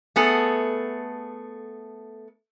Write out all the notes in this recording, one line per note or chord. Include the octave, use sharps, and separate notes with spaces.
A3 B3 G#4 A4